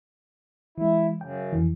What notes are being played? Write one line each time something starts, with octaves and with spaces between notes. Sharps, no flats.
E3 G#3 E4
F#2 C#3 G5
F2 E3